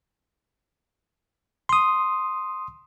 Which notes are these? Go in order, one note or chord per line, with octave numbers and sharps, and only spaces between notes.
C6 D#6